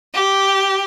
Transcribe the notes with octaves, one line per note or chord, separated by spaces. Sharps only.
G4